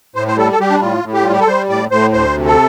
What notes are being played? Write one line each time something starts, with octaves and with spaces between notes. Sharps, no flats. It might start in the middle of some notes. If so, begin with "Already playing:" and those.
A2 C5
C5
G3 A4
A4
G3 G4
D4
A2 F4
A2
G4
G3 F4
G4
A4
G3 C5
A2 D5
A2 C5
D2 C5
C3
A4